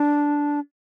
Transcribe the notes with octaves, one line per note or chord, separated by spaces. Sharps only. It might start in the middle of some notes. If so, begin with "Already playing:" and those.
Already playing: D4